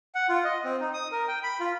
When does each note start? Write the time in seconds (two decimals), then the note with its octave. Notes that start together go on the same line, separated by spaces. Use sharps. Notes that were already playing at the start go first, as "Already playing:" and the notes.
0.15 F#5
0.29 F4
0.45 D#5
0.65 C4
0.80 D#4
0.94 D#6
1.12 A#4
1.28 G5
1.43 B5
1.60 F4